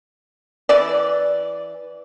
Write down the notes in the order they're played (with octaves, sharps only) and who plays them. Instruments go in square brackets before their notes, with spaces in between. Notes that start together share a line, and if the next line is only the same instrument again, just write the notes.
[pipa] E3 D5